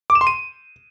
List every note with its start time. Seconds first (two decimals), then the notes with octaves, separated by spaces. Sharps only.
0.10 D6
0.15 E7
0.21 C6
0.27 D#7